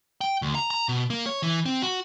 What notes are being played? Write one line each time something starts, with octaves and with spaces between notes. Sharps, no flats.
G5
D2
A#5
A#5
B2
A#3
C#5
E3
C4
F#4